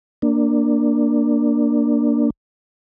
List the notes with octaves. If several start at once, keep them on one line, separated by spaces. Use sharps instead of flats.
A#3 D4